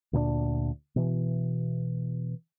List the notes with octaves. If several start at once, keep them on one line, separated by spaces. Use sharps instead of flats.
D2 A#2 B3 D4
B2 E3